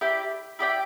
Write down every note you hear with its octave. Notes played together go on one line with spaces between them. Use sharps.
E4 G4 D5 G5
E4 G4 D5 G5